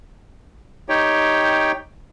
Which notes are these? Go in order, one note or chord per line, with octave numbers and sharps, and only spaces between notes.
D#4 G4 C#5 G5